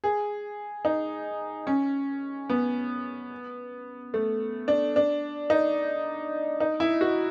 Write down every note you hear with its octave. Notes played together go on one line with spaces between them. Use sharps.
G#4
D#4
C#4
B3
A3
D4
D4
D#4
D#4
E4
F#4